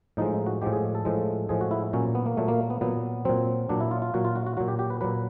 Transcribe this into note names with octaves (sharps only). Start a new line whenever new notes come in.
A2 F3 G#3 D#4
F#4
A2 F3 G#3 G4
G#4
A4
A2 F3 G#3
A2 F3 G#3 G#4
F#4
E4
A#2 F#3 C#4
B3
A#3
A#2 F#3 A3
A#3
B3
A#2 F#3 B3
A#2 F#3 C4
A#2 F#3 D4
E4
F4
F4
A#2 F#3 F#4
F4
F#4
F#4
A#2 F#3 F#4
G4
G4
B4
A#2 F#3 B4